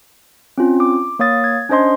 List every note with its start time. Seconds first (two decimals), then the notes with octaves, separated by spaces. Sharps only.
0.58 C4 C#4 F4
0.80 D6
1.19 A#3 C#5 F5 D#6 A6
1.44 G#6
1.69 C#4 D4 C5 D#5 C6